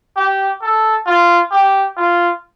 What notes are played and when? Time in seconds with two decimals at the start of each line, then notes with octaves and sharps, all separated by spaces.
0.16 G4
0.62 A4
1.07 F4
1.51 G4
1.97 F4